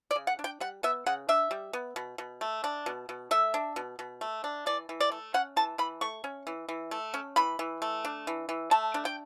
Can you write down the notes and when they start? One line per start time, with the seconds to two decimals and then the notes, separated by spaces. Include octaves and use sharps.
0.11 D5
0.16 C#3
0.27 F#5
0.39 D4
0.44 G5
0.60 G3 F#5
0.83 B3 E5
1.06 C#3 F#5
1.29 D4 E5
1.51 G3
1.73 B3
1.96 B2
2.18 B2
2.41 A3
2.64 D4
2.86 B2
3.09 B2
3.31 A3 E5
3.54 D4
3.76 B2
3.99 B2
4.21 A3
4.44 D4
4.66 E3 D5
4.89 E3
5.00 D5
5.12 A3
5.34 C#4 F#5
5.56 E3 A5
5.78 E3 B5
6.01 A3 C#6
6.24 C#4
6.47 E3
6.68 E3
6.91 A3
7.14 C#4
7.36 E3 B5
7.59 E3
7.82 A3
8.05 D4
8.27 E3
8.49 E3
8.71 A3 A5
8.94 D4
9.05 G5